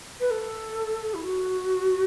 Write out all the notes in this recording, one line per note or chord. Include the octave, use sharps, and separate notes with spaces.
B4
A4
E4
F#4